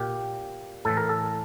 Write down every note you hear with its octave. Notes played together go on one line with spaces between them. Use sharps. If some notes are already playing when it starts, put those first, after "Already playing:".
Already playing: A#2 G4
A2 E3 A4
A#4
A4